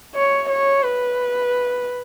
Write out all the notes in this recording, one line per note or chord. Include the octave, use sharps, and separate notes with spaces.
C#5
C#5
B4